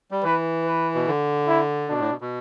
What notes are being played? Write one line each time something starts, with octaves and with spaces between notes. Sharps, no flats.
G3
E3 B4
B4
B2
D3
E4
B2 D4
A2
B2
B2